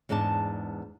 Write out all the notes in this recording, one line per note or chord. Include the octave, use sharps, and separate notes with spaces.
E2 G#2 B3 D4 A5